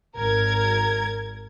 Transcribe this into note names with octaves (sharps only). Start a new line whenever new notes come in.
G#1 A#4 G#6